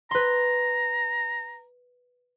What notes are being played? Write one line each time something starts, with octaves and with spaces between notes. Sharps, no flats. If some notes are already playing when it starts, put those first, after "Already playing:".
B4 A#5 C6